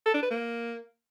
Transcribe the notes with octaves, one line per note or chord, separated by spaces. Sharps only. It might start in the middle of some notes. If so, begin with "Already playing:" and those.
A4
D4
B4
A#3